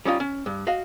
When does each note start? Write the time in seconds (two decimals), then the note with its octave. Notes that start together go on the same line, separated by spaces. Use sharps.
0.05 G3 C#4 D#4 F4
0.20 C#4
0.46 G2
0.67 F#4 D#5 F5